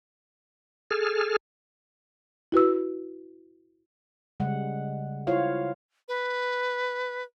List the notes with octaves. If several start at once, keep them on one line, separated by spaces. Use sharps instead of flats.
G#4 A4 F6
E4 F#4 B4 E6
C#3 G3 G#3 F#5
E4 F4 C5 C#5 F5
B4